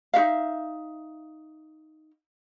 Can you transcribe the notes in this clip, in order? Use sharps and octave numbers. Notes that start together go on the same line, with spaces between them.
D#4 F#4 E5 F5